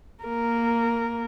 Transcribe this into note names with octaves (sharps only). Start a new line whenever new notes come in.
A#3 A#4